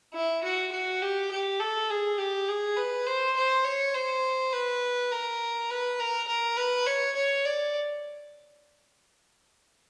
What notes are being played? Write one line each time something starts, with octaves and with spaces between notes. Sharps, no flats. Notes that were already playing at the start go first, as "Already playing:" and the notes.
E4
F#4
F#4
G4
G4
A4
G#4
G4
G#4
B4
C5
C5
C#5
C5
B4
A#4
B4
A#4
A#4
B4
C#5
C#5
D5